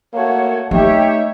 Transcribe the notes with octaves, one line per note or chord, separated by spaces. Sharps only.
A3 A#3 F#4 C#5
A3 D#4 G4 C#5 E5